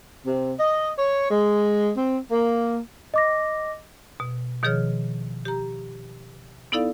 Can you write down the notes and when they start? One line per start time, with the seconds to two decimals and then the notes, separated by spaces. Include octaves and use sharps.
0.26 C3
0.59 D#5
0.97 C#5
1.30 G#3
1.96 C4
2.31 A#3
3.14 D#5 D6 A#6
4.20 B2
4.63 B2 D#3 F3 G#4 C#5 F6
5.45 G4 A#5
6.72 B3 D#4 E4 A4 D5 F5